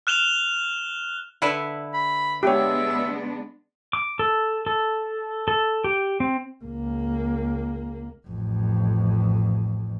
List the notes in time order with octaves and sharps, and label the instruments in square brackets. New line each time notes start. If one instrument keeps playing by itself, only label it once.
[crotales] F6 F#6 E7 F7 G7
[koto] D3 E4 B4
[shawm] B5
[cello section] G#3 B3 D4 [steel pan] G4 C#5 [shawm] E5
[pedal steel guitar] D6
A4
A4
A4
G4
C4
[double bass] C#2 A#3
A1 F2